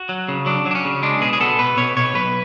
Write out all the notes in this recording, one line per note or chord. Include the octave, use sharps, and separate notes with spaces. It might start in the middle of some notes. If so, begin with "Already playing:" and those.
Already playing: F#4
F#3
C#3
F#3 D4
F#3
D4
C#4
C#3
G#3 D4
B2 G#4
G#4
B3 A4
B2 B4
B2 C#5
B2 C#5
B1 B4